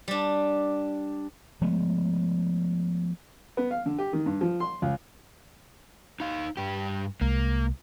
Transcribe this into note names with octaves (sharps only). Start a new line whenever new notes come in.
G3 D4
F3 G#3 A3 B3
B3
F5
D3
G4
D#3
G2
F3
C6
C#2
D#4 F5
G2 G4
C2 G#3 A#3